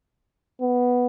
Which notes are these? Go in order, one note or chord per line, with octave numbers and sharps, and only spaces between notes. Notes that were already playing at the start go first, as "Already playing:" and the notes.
B3